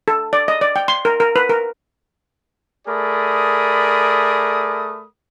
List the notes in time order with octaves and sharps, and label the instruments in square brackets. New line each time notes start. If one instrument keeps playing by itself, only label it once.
[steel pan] A4
D5
D#5
D5
G5
C6
A#4
A#4
B4
A#4
[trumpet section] A3 G#4 A#4 D5 B5 D#6